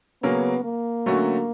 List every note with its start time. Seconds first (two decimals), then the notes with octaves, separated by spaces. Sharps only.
0.23 C#3 F#3 A#3 B3 C#4
0.64 A#3
1.06 D3 F#3 A3 C#4 F#4